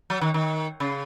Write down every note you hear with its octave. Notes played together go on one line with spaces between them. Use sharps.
F#3
D#3
D#3
C#3